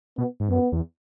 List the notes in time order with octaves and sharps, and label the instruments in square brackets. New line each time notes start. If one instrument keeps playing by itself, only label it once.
[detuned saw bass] B2 [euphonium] B3
[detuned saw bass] G#2
[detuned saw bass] F#2 [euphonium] B3
[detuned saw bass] E2